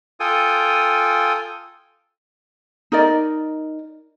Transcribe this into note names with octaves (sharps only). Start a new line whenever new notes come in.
F4 A4 G5 G#5 D#6
D#4 A#4 D5 D#5